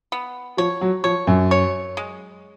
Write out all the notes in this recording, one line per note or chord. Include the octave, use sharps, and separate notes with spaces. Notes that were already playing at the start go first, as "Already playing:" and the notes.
B3
F3 C#5
F#3
F3 C#5
F#2
C#5
G#3